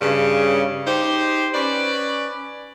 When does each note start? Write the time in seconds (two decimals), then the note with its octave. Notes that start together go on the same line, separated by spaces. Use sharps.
0.01 G2 C#3
0.87 D#4 G4 C5
1.53 C#4 B4 D5